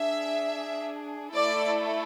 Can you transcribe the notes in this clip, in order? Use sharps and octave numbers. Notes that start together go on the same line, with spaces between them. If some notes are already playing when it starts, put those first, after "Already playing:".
Already playing: D4 G#4 E5
A3 E4 A4 D5